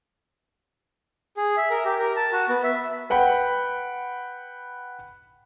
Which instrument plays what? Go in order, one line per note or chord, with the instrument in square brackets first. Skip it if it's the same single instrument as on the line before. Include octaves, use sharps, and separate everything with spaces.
[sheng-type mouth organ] G#4
E5
A#4
G4
A#4
A5
F#4
B3
E5
[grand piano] B4 F#5 G5 B5